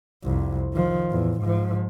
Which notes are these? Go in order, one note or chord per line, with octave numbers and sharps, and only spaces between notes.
C2 F2
D#3 F3
E2 A2
G#2 F3